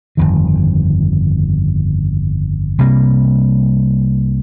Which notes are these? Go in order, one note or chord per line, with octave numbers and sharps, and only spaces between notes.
G1 F2 D#3
C2 C3 G3 A#3